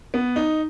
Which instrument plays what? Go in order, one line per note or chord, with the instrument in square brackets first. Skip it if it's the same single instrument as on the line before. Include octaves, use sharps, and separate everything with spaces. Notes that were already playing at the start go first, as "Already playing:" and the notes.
[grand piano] B3
D#4